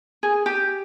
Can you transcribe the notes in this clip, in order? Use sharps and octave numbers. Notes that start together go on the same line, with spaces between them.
G#4
G4